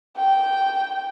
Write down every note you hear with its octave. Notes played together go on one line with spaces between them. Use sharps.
G5